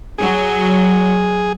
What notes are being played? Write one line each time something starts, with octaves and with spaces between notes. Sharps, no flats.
F#3 G#4